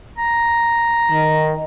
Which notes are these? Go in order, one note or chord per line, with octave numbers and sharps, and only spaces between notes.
A#5
D#3